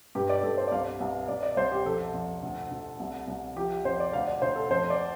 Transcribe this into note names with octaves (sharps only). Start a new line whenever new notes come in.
G2 G4
D5
G2 A4
C5
D5
C2 F5
C2
C2 D5
D5
C2 C5
G4
F2 A4
F2
D2
D2
C2
C2
F3 G4
F2 C5
D5
D2 F5
D5
D2 C5
A4
F2 C5
D5